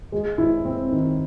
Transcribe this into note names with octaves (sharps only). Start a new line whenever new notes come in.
G#3
E4
C4
D#3